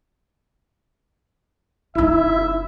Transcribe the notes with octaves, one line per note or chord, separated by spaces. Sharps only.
F#1 D#4 E4 E5